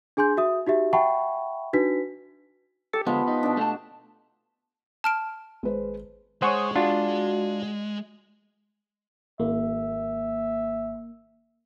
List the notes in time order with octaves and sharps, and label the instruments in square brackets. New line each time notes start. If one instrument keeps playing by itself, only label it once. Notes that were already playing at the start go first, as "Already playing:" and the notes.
[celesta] D4 G#4 G#5 C6 G6
F#4 E5 D#6
D#4 F#4 G4 E5
E5 F#5 G5 A5 B5 C#6
D4 D#4 F#4 B4 B6
[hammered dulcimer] G4 [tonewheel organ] A4
[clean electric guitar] D3 G#3 [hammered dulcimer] F3 [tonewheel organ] B3
[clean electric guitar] D#4
[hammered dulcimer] B2 D4
[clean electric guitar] A3 A5
[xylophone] A5 F6 D7
[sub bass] G#1 [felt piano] G#3 B4 C5
[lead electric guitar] G#3 [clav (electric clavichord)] C5 F#5 G#5 [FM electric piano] C#5 C#6 D#6
[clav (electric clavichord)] D4 F4 [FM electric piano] F#4
[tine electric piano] G#1 [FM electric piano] A#3 [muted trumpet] E5